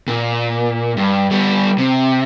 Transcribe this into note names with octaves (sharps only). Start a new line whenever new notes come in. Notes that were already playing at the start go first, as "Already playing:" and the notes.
A#2
G2
G3 B3
C3